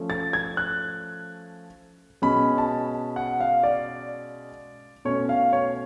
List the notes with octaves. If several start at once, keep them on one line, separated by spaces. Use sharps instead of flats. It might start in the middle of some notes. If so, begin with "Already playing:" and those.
Already playing: F3 A3 C#4
A6
G#6
F#6
B2 G#3 C#4 B5
A5
F#5
F5
D5
B2 A3 C#4 C#5
F5
C#5